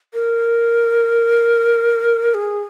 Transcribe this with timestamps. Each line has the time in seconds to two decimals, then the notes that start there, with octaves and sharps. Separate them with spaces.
0.14 A#4
2.34 G#4